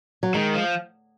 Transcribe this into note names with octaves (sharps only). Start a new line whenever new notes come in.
F#3
D#3 G#3
F3